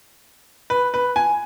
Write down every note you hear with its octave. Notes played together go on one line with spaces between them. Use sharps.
B4
B4
G#5